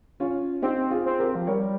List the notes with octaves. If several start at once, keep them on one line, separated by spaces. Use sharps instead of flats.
C#4 F4
C4 D#4 G4
F4 G#4
C4
G4 A#4
F3
G3 A#4 C#5